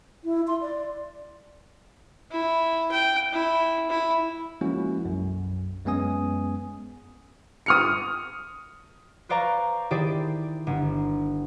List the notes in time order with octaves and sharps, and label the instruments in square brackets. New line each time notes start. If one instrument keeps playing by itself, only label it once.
[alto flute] E4
C6
D5
[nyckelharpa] E4
G5
E4
E4
[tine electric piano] F3 G#3 A#3 C#4 E4 F#4
B1 F#2
F#2 G#3 B3 C#4 G#5 D#6
[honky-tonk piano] D#6 F6 C#7
[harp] B4 C5 D5 F5 A#5 C#6
D#3 E4 G4 G#4 C5 D5
G1